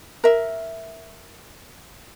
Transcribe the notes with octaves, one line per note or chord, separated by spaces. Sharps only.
A#4 E5